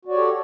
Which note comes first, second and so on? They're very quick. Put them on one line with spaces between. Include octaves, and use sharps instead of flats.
F#4 D5 C#5 G4 A4